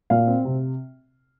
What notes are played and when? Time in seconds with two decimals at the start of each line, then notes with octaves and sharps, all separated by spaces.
0.10 A#2 F5
0.27 C4
0.45 C3